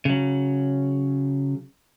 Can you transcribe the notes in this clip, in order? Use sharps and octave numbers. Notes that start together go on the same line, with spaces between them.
C#3 F#3